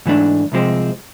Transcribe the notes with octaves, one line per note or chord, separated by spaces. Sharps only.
G#2 E3 A3 D4
C2 C3 F3 G#3 C4